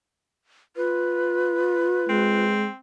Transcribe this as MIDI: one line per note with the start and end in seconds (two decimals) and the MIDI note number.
0.76 2.44 65
0.76 2.53 71
2.09 2.68 56
2.09 2.77 60